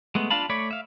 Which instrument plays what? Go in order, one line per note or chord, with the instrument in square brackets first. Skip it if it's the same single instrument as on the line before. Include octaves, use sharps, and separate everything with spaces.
[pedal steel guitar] G#3 A3 B3
D4 F4 F5 A5 B5
A3 C#5 D5 B5
E5 F5